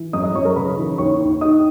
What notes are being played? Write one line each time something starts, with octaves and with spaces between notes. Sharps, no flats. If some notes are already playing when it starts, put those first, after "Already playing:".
Already playing: E3
F#2 D#5 D#6
D#5 D#6
F#2 C#5 C#6
A#4 A#5
C#3 B4 B5
E3
D#2 C#5 C#6
D#2
D#3 D#5 D#6